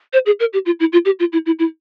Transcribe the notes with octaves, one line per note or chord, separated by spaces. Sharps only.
C5
G#4
A#4
G4
F4
E4
F4
G4
F4
E4
E4
E4